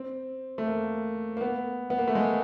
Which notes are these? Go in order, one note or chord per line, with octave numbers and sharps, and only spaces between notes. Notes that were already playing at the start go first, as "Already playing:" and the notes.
Already playing: C4
A3
A#3
A#3
B3
B3
A#3
A3
G#3